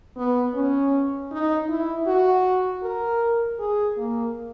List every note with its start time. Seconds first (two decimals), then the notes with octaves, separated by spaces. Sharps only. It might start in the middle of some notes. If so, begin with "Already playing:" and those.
0.17 B3
0.55 C#4
1.31 D#4
1.69 E4
2.07 F#4
2.83 A#4
3.60 G#4
3.98 A#3